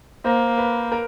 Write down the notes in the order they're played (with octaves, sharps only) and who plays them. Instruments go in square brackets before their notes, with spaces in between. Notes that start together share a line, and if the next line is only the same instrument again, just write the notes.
[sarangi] A#3 [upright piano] C5
[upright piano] B4
A#4